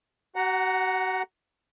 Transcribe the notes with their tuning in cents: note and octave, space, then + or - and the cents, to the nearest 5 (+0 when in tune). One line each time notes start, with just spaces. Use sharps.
F#4 +35 F#5 +0 A#5 +0